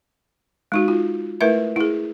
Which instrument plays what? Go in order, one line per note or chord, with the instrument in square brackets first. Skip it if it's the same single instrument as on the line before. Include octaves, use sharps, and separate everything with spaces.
[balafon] G#3 D#4 F#4
F4
A3 E4 A#4 B4 E5
E4 G#4